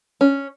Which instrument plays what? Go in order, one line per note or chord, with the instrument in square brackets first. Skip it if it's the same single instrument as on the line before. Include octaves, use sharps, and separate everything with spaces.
[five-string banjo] C#4